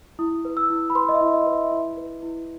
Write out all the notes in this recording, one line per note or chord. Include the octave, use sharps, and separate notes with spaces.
E4 D#6
B4
E6
E4
B5
B4 C6
D#5
E5
E4
D#5
B4
E5
E4
B4
E4